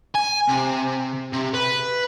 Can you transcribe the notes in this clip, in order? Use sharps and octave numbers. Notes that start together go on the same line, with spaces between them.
G#5
C3
C3
B4